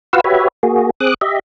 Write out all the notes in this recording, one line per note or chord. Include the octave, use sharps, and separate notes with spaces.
F4 F#4 B4 F5 F#5 E6
F#4 G4 B4 C#5 E5
A#3 F#4 G#4
C4 G#4 D6 D#6 F#6
G4 D#5 E5